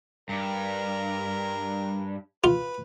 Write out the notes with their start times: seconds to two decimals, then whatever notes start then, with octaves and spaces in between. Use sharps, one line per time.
0.29 G2 A#4
2.44 F4 B4